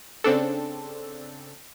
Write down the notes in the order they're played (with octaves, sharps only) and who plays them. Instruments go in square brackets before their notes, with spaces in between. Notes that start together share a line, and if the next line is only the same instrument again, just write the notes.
[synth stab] C#3 C4 D4 A4